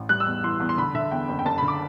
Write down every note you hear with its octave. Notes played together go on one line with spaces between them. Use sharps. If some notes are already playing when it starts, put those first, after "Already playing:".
Already playing: A1
G3 F#6
E6
E2
E3 C6
E2
C6
D3 B5
D3 E5
E2 G5
F#1
G5
F#1 A5
B5
D3
D6